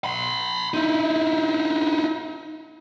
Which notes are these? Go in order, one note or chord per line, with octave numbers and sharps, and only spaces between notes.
B5 C6
D#4 E4